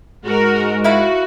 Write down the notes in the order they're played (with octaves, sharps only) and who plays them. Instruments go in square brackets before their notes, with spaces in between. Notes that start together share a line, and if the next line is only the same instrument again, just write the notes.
[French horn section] G#2 G#3 [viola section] F#4 A#4
[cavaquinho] E4 F5 B5 [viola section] F#4